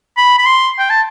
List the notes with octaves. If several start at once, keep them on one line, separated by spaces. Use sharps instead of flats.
B5
B5
C6
G5
A5